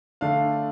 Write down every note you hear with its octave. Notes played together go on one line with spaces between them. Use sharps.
D3 A3 D4 F5